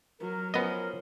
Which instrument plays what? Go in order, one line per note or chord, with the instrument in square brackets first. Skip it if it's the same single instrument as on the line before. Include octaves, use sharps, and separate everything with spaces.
[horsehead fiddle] F#3 [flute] A#4
[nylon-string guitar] F3 C#4 [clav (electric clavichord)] B3 D#5 [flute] A#4